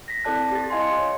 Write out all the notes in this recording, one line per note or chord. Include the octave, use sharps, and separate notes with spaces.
A#6 B6
C4 E4 A4 D5 A5 F#6
G4 A6
E4 D#5 F5 G#5 C6
C#7
C#5